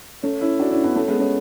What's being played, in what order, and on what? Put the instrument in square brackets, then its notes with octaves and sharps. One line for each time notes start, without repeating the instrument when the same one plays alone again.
[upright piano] A3 C#4
C#4 E4
D4 F#4
C#4 E4
B3 D4
A3 C#4
G#3 B3
A3 C#4